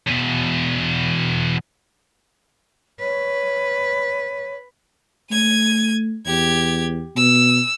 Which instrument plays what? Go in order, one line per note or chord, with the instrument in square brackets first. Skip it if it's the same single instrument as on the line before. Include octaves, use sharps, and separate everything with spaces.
[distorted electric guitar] E2 B2
[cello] B4 [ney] C#5
[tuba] A3 [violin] G#6 D#7
[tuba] E2 [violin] G4 G#6
[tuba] B2 [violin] E6